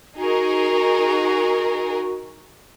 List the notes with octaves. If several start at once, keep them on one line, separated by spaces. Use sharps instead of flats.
D#4 F#4 G#4 A#4